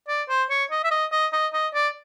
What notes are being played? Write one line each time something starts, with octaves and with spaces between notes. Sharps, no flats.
D5
C5
C#5
D#5
E5
D#5
D#5
D#5
D#5
D5